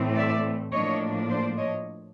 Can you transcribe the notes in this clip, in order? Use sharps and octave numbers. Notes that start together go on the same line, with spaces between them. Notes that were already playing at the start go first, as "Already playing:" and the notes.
Already playing: A2 E3 A3 C4
D5 E5
A2 F3 A#3 D4 C#5 D#5
C5 D5
C#5 D#5